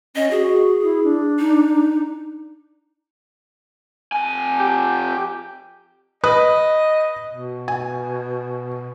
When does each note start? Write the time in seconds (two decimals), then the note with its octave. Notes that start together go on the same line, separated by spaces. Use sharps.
0.16 C#4 D#5
0.31 F#4 G#4
0.83 E4
1.04 D4
1.39 D#4
4.12 F2 G#5
4.60 G4
6.24 B4 D#5 D#6 F#6
7.31 B2
7.68 G#5